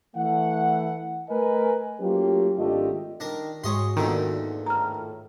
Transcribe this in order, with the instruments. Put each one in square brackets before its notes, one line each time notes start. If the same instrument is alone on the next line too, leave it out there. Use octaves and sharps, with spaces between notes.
[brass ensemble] E3 A3 F#5
A3 A#4 B4 D#5 G#5
F#3 A3 A#3 C#4 F4 G4
G#1 A3 D4 F4 G4 D#5
[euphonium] D#3 [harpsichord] D4 A#4
[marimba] G#2 G#3 [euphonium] F#4 [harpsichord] C#5 D#5 C6
[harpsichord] E2 A#2 D3 [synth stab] D#3
[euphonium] A2 [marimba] A#5 F6